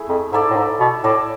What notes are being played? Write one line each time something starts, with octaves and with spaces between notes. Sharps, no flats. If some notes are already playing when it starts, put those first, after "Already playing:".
Already playing: A3 E4 G#4
F2
G#2 E4 A4 D5
A2
G#2
B2
A2 E4 A4 D5